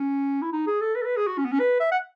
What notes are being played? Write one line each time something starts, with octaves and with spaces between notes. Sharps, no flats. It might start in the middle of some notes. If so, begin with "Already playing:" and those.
Already playing: C#4
E4
D#4
G#4
A4
B4
A4
B4
G#4
F#4
C#4
B3
C#4
B4
E5
F#5